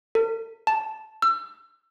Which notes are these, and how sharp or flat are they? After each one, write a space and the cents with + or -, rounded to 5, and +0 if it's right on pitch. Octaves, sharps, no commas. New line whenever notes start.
A4 +45
A5 -10
E6 +30